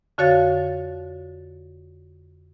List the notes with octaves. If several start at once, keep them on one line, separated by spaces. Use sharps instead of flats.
F2 D3 F#4 C#5 F5 A6